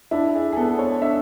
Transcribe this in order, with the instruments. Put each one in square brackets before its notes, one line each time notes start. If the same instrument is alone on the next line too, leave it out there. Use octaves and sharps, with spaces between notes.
[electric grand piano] D4 [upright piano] E4
[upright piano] G#4
G#4
[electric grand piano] B3 [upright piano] A4
[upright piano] C#5
[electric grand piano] D4 [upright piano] E5